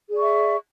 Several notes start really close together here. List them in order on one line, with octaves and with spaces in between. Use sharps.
G#4 D5 C#6 E5